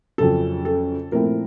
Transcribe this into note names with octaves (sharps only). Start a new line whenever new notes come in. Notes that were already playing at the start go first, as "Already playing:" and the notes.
F2 C#3 F#3 A4
A4
A#2 F3 A3 C4 E4 A#4